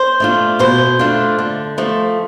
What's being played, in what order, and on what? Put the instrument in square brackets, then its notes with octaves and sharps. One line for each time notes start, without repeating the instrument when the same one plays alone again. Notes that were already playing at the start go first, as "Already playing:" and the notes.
Already playing: [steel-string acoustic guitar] C5
A3 D4 F4
B2 C5
A3 D4 F4
D3
F3 A3